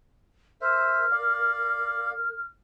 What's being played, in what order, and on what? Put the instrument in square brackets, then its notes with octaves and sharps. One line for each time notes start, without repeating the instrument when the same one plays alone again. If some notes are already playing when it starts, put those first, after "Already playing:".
[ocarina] A#4 [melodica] C5 E5 [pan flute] F6
[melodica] D5 F5